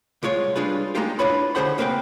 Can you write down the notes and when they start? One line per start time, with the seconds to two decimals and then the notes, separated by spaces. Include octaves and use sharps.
0.23 C2 G#3 F4 C#5
0.56 G3 G#3 D4 F4 G#4 B4
0.95 G#3 A#3 D#4 F4 G4
1.19 D4 E4 F4 B4 C#5 B5
1.55 D3 C#4 G#4 C5 F#5 B5
1.78 C#2 A#3 C4 B4 F5 G5